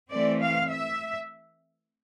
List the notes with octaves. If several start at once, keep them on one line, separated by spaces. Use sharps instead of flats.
E3 A3 C4 D5
F5
E5